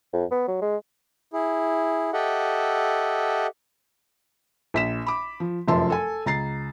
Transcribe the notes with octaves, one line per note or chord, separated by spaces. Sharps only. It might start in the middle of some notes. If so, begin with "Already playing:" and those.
F2
B3
F#3
G#3
E4 G#4
G4 A4 D#5 E5 F#5
A#1 B6 E7
B5 D6
F3
F1 F#2 F3 E5 A5 C6
A4 G#5
C#2 A#5 A6 C7